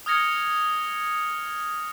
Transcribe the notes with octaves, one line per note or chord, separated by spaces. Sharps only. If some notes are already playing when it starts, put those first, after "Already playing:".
D#6 F6 G#6 A#6 C#7 G7